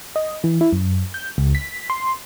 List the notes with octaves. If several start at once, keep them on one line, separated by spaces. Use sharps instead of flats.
D#5
E3
E4
F#2
G6
C#2
B6
C6